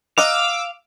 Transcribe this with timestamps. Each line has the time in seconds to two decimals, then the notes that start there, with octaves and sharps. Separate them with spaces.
0.18 D#5 F5 F#5 A#5 D6 E6